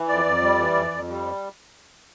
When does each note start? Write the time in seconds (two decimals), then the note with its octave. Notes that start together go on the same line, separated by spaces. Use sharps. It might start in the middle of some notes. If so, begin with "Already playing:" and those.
Already playing: E3
0.08 F2 D5
0.25 F2
0.41 G3
0.58 E3
0.75 F2
0.90 F2
1.08 G3